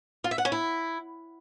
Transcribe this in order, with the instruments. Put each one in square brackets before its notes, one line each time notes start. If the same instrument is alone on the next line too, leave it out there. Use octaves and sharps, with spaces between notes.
[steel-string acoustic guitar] F4
E5
F#5
C#4
E4